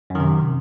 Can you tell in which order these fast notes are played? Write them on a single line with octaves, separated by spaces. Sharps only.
F#2 D#3 C3